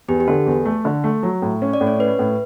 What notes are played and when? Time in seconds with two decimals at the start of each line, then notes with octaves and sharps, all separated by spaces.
0.08 E2 G4
0.20 G4
0.28 D3 A4
0.47 E2
0.65 A3
0.85 D3
1.04 A3
1.23 F#3
1.42 A2
1.62 C#4
1.73 D5
1.81 A2
1.87 C#5
1.99 C#4 B4
2.19 A2